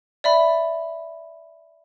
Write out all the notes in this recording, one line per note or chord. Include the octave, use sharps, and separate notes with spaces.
D5 E5 B5